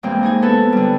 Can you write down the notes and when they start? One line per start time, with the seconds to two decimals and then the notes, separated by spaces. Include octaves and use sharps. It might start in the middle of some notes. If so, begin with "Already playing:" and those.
0.03 E2 C3 G#3 A#3 G5
0.23 D#4 G#4 G#5
0.42 B3 A4 B4
0.73 D3 G3